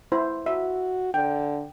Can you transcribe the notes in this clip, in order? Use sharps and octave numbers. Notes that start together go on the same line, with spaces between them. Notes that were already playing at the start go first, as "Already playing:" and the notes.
E4 C5
F#4 E5
D3 G5